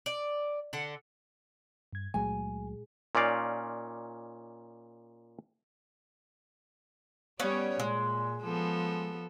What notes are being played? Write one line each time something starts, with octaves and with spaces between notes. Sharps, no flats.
D5
D3 A4 F#5
G2 G#6
C#2 A#2 F#3 G#3 A3 G#4 G#5
A#2 C#4 D#4 D5 F5
G3 B3 C#4 C#5 D5
A#2 G#3
F3 B3 A4